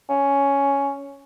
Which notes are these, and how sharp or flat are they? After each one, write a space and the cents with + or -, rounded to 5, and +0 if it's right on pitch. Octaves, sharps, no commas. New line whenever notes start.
C#4 +5